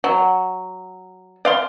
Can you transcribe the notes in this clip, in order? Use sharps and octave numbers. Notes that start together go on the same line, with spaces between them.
F#3
D5 F5 C6